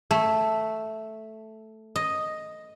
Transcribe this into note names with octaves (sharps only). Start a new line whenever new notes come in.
A3
D#5